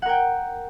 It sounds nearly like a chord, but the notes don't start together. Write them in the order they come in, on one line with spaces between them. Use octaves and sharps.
F#5 A#4 G5